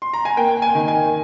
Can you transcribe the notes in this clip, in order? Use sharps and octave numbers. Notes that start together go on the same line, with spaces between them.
C6
A#5
G#5
A#3 G5
G#5
D#3
G#5